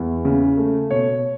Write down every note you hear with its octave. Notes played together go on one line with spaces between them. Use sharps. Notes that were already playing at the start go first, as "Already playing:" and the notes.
Already playing: E2
C#3
A3
B2 C#5